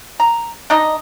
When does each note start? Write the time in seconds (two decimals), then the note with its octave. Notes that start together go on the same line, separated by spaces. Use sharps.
0.20 A#5
0.70 D4 D#4 D#5